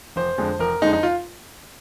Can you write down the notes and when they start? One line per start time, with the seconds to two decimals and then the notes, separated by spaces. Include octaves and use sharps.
0.16 F1 C5
0.38 F2 D3 G#3
0.59 F1 A#4
0.82 F2 D3 G#3 D#4
0.93 D#4
1.03 F4